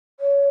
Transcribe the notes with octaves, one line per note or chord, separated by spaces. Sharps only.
C#5